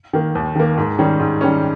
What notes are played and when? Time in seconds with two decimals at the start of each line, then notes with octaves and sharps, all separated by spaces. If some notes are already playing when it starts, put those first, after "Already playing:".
0.13 D#3 A#3
0.35 D#2
0.55 D#3 A#3
0.77 G#2
0.98 D#3 G3 C#4
1.19 G#2
1.41 D#3 G3 C#4